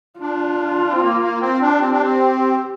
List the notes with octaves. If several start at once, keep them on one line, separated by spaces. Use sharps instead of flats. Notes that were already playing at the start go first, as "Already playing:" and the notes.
D4 F4
C4
A#3
A#3
C4
D4
C4 G4
D4
C4